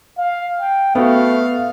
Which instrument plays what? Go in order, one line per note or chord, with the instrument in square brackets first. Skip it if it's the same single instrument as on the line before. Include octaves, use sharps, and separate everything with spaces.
[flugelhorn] F5
G5
[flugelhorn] A3 [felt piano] B3 F#4 [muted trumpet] F5